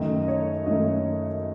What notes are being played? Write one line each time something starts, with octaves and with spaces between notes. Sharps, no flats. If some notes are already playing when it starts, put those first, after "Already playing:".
Already playing: F#2 D#3 A3 D#5
D#5
C#5
F#2 D#3 A3 D#5